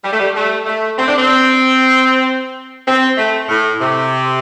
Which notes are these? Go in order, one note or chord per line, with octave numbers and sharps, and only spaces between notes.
G3
A3
G3
A3
A3
C4
D4
C4
C4
A3
A2
C3